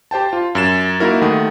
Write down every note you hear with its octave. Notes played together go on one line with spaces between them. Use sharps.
G4 C5 G5 A5
F4
F#2 A6 E7
A#3 D#4 E4 F#4 A#4
D#2 D#3 A3 F#5 D#6